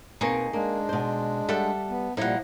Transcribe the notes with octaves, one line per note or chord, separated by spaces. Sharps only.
B2 A#3 C4 D#4 G#4 C#6
G#3 A#3 D4
B2 C5
G3 A4 E5 F#5
B3
A#2 F3 G3 D#4 E4 F#5